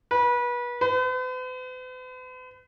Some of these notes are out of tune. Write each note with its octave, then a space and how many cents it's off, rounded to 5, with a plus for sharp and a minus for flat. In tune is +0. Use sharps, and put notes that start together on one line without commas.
B4 -30
B4 +45